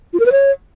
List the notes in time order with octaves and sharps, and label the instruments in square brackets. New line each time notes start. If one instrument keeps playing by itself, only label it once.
[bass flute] F4
A#4
B4
C#5